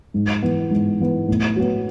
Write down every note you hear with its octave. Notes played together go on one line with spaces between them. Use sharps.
G#2
E3 B3
G#2
E3 B3
A2
F#3 B3